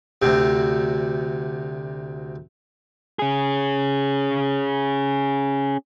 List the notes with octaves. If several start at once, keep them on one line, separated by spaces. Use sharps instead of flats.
D2 C3
C#4 G#4